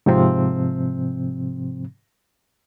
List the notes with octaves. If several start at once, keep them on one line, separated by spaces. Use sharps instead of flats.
G#2 C3 F3 C4